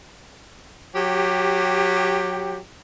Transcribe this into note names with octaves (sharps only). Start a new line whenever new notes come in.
F#3 G4